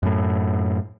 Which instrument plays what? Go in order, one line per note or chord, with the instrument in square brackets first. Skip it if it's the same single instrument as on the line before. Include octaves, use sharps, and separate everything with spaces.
[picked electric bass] F#2 A2